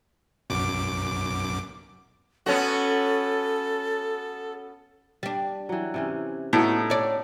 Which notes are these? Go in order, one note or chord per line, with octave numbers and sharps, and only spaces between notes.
B1 F#2 D6
B3 C#4 F#4 A4
G3 D4
E3 F#3
C3 E3 C#4
A2 B3 D#4 F#4 A4
C#5 D5